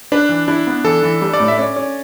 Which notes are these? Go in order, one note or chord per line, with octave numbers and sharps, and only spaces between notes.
D4 B4
E3
D4 E4
B3
E3 A4
E3
G3
D5
A2
E5
C#4 D5
C#4